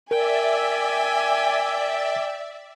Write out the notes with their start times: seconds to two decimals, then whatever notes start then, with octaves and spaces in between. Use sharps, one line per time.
0.11 A#4 D5 E5 G5 G#5